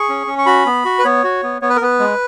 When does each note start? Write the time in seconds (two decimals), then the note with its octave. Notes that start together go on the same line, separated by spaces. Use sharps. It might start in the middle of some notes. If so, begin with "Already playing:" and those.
Already playing: G#4 C#6
0.09 C#4
0.27 C#4
0.38 C#6
0.46 F#4 B5
0.66 B3
0.85 F#4
0.99 B4
1.04 B3 C#5
1.24 F#4
1.43 B3
1.62 B3 C#5
1.69 B4
1.76 A#4
1.81 B3 B4
1.99 G#3